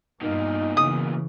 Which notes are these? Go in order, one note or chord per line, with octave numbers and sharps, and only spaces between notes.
G2 B2 A#3 D#4
C#3 E3 D#6